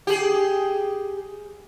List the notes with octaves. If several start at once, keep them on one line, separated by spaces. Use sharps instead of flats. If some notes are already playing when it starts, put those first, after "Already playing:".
G4 G#4